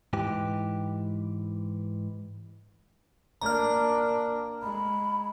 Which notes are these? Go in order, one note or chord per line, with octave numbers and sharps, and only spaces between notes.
G#2 E3 G4
A#3 D4 A#5 F6
G#3 B5